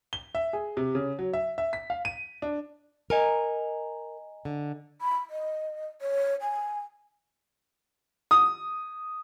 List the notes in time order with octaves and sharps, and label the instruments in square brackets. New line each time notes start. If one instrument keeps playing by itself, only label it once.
[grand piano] G7
E5
G#4
C3
C#3
F#3
E5
E5
B6
F5
D#7
D4
[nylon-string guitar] A#4 [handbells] D#5 G#5 A#5
[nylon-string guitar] D3
[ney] B5
D#5
C#5
G#5
[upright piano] D#6